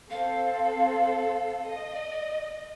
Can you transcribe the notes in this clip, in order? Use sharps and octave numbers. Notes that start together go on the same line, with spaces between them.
C4 A4 F5
D#5